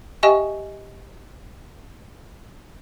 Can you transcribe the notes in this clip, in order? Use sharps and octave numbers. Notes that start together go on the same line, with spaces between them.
G4 D#5 E5 G5 G#5 C#6